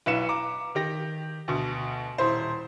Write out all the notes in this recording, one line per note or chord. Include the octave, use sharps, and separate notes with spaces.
B1 E4 B4 F5 C#7 E7
A#5 D6
D#3 G4 A#6
D2 B2
D#1 E4 C5